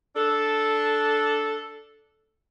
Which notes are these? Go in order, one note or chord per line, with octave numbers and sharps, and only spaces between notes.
D4 A4